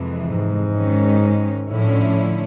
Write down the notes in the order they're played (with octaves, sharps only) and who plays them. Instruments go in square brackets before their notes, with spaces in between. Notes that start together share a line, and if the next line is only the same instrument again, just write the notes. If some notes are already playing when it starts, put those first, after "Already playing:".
Already playing: [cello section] F2 C3 E3 G#3
[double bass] G#2
[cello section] D#3 G#3 C#4
[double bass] A2 [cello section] D3 F3 A3 C#4 E4